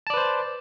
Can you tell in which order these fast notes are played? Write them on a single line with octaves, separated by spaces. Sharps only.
A5 D5 B4 C5